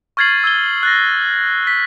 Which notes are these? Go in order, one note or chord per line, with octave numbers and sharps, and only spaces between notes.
C#6 F6 G#6 A6 C7 F#7
E6 G#6 G7
F#6 A6 A#6
B6